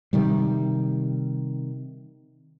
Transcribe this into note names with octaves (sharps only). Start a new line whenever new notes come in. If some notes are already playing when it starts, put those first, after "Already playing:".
C3 D#3 G3